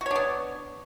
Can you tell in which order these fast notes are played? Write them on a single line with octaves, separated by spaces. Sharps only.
F#4 C#5 D4 B3